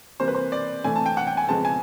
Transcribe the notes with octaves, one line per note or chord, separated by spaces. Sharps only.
C3 E3 G3 A#3 C5
B4
C5
D5
A2 E3 A3 C4 G#5
A5
G5
F#5
G5
G#5
F2 C#3 F3 G#3 B3 A5
G#5